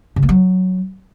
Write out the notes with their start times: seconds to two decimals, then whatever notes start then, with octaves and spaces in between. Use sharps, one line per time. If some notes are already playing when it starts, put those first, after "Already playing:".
0.16 C#3
0.23 A#3
0.29 F#3